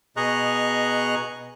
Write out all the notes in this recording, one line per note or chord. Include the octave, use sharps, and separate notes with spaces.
B2 G#4 D#5 A#5 C#6 F#6